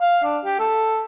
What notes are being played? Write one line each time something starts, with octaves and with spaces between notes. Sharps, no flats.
F5
D4
G4
A4